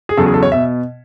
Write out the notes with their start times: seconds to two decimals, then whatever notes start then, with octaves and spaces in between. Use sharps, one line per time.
0.09 G#4
0.17 E2 C#3 F#3 A4
0.26 G#4
0.34 A4
0.43 C#5
0.52 B2 E5